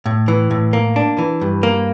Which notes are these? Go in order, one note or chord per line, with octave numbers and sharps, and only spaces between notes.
A2
E3
A2
A#3
D4
E3
G2
A#3